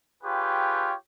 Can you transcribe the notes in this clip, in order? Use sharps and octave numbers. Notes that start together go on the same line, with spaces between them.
F4 G4 G#4 B4 C#5 G5